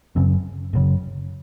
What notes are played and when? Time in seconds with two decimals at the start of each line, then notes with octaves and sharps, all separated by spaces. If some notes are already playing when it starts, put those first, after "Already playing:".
0.15 F#1 F#2 C#3 C4
0.73 F#1 F#2 C#3